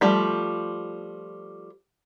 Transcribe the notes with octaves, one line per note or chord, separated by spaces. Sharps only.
F3 G3 A3